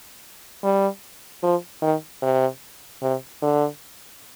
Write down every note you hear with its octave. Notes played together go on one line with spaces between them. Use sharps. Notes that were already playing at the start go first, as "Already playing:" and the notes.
G3
F3
D#3
C3
C3
D3